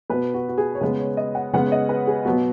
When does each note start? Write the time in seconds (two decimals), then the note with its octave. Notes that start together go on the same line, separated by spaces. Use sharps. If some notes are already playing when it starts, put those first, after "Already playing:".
0.10 B2 B3 B4
0.34 F#4
0.49 F#4
0.58 G#4
0.75 C#5
0.81 C#3 G#3 B3 B4
0.99 C#5
1.17 D#5
1.35 F#5
1.53 C#3 G#3 B3 F#5
1.66 C#5
1.72 D#5
1.89 B4
2.07 G#4
2.25 B2 F#3 B3 F#4